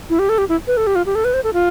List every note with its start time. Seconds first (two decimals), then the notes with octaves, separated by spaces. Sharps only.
0.10 E4
0.19 G4
0.29 A4
0.38 G4
0.49 E4
0.67 B4
0.77 A4
0.87 G4
0.95 F4
1.06 G4
1.15 A4
1.25 B4
1.34 C5
1.44 A4
1.54 F4